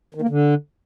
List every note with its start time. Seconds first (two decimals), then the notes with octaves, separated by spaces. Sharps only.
0.15 D#3
0.22 A#3
0.29 D3